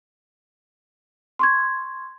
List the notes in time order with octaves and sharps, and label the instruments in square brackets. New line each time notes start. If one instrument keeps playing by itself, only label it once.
[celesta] C6 C#6 G#6